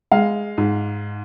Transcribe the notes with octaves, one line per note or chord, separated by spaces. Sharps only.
G#3 F5
G#2